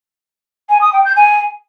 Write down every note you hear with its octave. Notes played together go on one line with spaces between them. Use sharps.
G#5
D#6
G5
G6
G#5